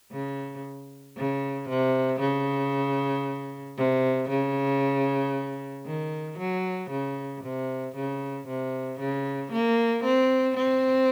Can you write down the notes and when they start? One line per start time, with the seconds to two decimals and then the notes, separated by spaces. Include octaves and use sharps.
0.12 C#3
1.17 C#3
1.69 C3
2.20 C#3
3.77 C3
4.29 C#3
5.86 D#3
6.38 F#3
6.90 C#3
7.43 C3
7.95 C#3
8.47 C3
8.99 C#3
9.52 A#3
10.04 C4
10.56 C4